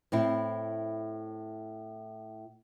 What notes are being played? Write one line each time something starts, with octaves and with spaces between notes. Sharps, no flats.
A2 C4 E4